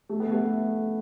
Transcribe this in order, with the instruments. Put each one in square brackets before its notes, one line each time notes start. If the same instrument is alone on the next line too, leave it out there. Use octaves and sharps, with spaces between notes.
[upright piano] A3
B3
A3